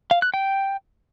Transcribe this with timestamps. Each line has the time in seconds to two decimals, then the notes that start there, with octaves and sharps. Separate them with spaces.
0.11 F5
0.22 F#6
0.34 G5